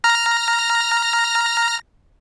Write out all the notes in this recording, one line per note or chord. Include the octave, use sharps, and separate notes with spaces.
A#5 F6 A#6